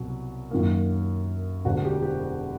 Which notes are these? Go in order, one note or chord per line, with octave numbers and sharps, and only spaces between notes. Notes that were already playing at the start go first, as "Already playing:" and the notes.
Already playing: C2 B2 F#3
F#2 D#3 F#3 A#3
E1 D2 D3 F#4
G4
G4